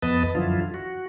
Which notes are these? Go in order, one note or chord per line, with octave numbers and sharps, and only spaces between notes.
F2 B3 B4 D#5 A5
F#2 D3 F3 E4 F4
F#4